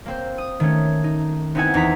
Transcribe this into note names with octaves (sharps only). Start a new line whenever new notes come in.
A#3 C4 C5
D#6
D#3 A3 C#4
D#4
B3 C4 D#4 E4 F#5 G#5
E2 D#4 A#5 B6